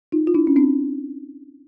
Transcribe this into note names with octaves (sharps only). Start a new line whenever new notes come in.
D#4 F4
F4
D4 E4
C#4
C4 D4